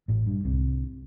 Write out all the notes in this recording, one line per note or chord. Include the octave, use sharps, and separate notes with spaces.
A1 A2
G2
C2 C3